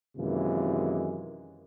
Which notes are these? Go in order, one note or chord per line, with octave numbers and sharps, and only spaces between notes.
F#2 C3 D#3 E3 G#3 A#3